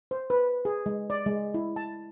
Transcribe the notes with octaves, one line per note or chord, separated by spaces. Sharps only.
C5
B4
G#4
G#3
D5
G#3
E4
A5